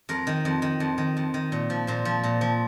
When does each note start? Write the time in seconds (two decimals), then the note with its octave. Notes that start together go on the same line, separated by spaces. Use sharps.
0.09 F2 A#4
0.27 D#3
0.45 F2
0.62 D#3
0.80 F2
0.98 D#3
1.17 F2
1.34 D#3
1.52 A#2
1.70 F3
1.87 A#2 C5
2.05 F3
2.23 A#2
2.41 F3